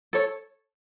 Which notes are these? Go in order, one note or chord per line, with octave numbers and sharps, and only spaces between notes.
A4 C#5